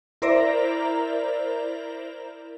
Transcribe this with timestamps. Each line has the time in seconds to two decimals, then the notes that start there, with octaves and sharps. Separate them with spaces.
0.22 E4 A#4 C5 D5 E5 A#5